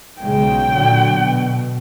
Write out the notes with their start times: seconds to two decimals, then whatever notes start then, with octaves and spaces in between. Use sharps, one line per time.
0.21 B1 C#3 G#3 G5
0.70 A#2 D3 F#3
1.07 B2